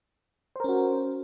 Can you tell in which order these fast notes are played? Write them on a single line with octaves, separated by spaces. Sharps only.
C5 A#4 C#4 F#4